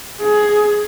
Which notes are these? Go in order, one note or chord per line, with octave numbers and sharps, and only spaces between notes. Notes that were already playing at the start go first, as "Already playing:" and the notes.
G#4